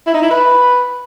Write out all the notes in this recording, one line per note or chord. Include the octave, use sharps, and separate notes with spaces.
E4
D#4
E4
B4